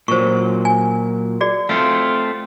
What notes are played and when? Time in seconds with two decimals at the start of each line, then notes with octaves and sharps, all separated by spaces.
0.08 A#2 F#3 C5 C#6
0.65 G#5
1.41 F#4 G#4 D5
1.69 A3 C4 F4 F5